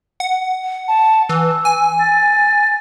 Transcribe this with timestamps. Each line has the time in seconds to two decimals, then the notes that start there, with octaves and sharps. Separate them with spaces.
0.20 F#5
0.88 A5
1.29 E3 E6
1.65 G#5
1.99 A6